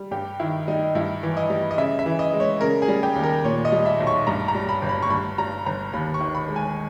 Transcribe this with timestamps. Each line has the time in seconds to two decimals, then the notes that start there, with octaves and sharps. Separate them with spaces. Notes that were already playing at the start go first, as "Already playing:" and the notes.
Already playing: G3
0.11 G2 G4
0.40 D#3 E4
0.68 G3 D#4
0.95 G2 E4
1.23 E3
1.37 D#5
1.50 G3
1.71 D#5
1.78 C#3 E5
1.99 E5
2.06 E3
2.19 D#5
2.33 G#3
2.40 C#5
2.61 C#3 A#4
2.82 G#4
2.88 G3
3.03 G4
3.16 D#2
3.23 A#4
3.44 A#2 C#5
3.65 D#5
3.72 G3
3.86 E5
4.00 B1
4.07 C#6
4.27 G2 A#5
4.48 A#5
4.55 G3
4.69 B5
4.82 G1
4.89 B5
5.02 C#6
5.10 G2 B5
5.38 G3 A#5
5.66 G1 A#5
5.93 D#2 B5
6.14 C#6
6.21 D#3
6.35 B5
6.48 G#3
6.56 G#5